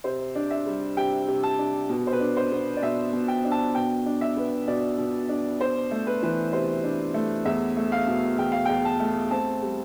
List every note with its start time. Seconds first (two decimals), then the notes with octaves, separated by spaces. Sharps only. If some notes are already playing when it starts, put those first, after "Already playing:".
0.04 C3 C5
0.35 D4
0.51 E5
0.66 G3
0.97 C3 G5
1.28 C3
1.43 A5
1.59 D4
1.89 B2
2.07 C5
2.13 B4
2.20 D4
2.37 C5
2.52 B3
2.77 D5
2.82 B2 E5
3.13 B2
3.28 G5
3.44 D4
3.51 A5
3.75 B2 G5
4.06 D4
4.21 E5
4.37 B3
4.68 B2 D5
4.98 B2
5.29 D4
5.60 D4 C5
5.91 A3
6.07 B4
6.23 E3 B4
6.53 C3 C5
6.84 D4
7.14 A3
7.45 E2 E5
7.77 A3
7.92 F5
8.07 B2
8.38 E2 G5
8.52 F5
8.65 E2 G5
8.85 A5
9.00 A3
9.30 C4 A5
9.62 G3